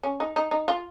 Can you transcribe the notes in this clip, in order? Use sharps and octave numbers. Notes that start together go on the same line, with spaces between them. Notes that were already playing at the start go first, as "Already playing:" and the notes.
C#4
D#4
D#4
D#4
F4